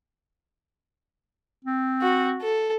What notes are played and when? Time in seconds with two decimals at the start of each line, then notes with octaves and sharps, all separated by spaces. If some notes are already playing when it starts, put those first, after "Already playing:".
1.64 C4
2.01 F#4
2.41 A4